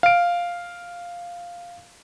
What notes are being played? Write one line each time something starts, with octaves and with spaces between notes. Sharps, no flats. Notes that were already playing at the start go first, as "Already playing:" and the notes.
F5 D7